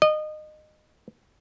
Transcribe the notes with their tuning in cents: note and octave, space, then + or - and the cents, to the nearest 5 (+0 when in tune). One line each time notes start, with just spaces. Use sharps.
D#5 -25